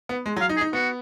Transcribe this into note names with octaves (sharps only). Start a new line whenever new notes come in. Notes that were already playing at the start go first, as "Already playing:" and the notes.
B3
G#3
F#3
F5
D#4
G#4
D#4
B3 F#4